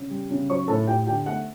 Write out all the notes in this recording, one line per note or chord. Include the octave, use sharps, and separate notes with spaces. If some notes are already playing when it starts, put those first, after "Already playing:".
Already playing: C#3
G3
C#3
F#3 C#5 C#6
A2 A4 A5
A2 G4 G5
D3 G4 G5
A3 F#5